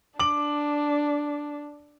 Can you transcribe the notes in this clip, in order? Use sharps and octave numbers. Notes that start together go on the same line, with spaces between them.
D4 D6 F#7